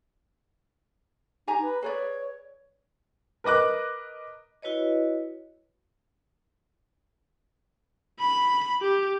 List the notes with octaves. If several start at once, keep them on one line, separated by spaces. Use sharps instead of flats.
D#4 G4 G#5 A#5
B4
G#4 B4 C#5 D5
A#4 B4 D#5 D6 F#6
E4 F#4 B4 C#5 D#5
B5
G4